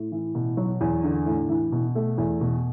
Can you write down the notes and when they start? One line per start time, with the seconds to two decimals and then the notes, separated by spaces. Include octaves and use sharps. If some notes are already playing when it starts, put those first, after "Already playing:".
Already playing: A2
0.12 E3
0.35 B2
0.57 F#3
0.81 E2
1.04 D3
1.26 A2
1.49 E3
1.72 B2
1.95 A3
2.18 E2
2.41 B2